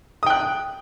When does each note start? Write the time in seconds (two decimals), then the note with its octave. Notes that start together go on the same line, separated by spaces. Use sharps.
0.23 D#6
0.26 G5
0.30 F#6